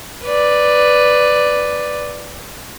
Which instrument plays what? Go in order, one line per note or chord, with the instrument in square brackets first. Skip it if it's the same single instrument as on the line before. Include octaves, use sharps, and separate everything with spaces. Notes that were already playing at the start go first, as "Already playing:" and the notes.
[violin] B4 D5